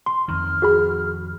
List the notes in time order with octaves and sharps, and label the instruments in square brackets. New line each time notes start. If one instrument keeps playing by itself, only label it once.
[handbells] C6
[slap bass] F2 D#3 [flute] F6
[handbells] F#4 G#4 B5